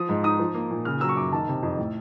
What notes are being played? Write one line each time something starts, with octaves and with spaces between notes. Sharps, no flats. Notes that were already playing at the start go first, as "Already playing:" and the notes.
Already playing: F3 D#6
G#2
D#4 D#6
F3
A#3
A#2
C#3 F6
F#3 E6
C#6
F#2 D6
D#3 A5
C3
F2
A2